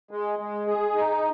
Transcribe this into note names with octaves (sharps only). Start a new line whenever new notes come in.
G#3
G#3
G#4
D#4